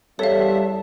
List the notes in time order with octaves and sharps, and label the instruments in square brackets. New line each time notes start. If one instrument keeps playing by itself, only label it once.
[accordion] E2 E5 [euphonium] G3 [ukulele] A4 [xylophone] C#5 F5